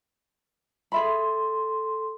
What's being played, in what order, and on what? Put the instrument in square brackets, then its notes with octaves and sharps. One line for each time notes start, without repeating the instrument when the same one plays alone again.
[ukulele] G#4 E5 B5 [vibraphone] A4 C6